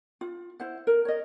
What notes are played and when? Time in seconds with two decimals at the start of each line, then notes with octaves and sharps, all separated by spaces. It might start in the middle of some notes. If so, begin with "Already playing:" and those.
0.21 F4
0.60 E4 C5 F#5
0.87 A#4
1.05 C#5 D#5